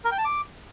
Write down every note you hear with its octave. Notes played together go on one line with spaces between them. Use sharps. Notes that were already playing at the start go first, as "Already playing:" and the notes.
A#4
G5
A5
D6